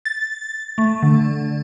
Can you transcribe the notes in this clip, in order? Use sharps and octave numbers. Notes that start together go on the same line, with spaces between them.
A6
A3
D3